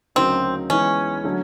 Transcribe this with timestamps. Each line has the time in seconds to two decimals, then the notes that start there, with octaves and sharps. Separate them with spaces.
0.15 D2 C#3 F#3 A#3 C4 D#4
0.70 E3 G#3 B3 C#4 D#4
1.24 D3 F#3 A3